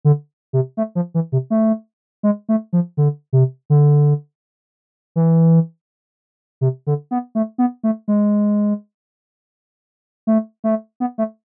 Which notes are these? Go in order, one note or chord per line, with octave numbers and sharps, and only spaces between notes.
D3
C3
A3
F3
E3
C3
A3
G#3
A3
F3
D3
C3
D3
E3
C3
D3
B3
A3
B3
A3
G#3
A3
A3
B3
A3